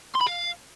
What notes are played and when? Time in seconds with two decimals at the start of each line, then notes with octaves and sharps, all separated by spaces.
0.15 C6
0.21 B5
0.26 F5